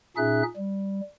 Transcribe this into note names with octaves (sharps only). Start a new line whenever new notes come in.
A#2 C#4 D#4 G#4 E5 F#6
G3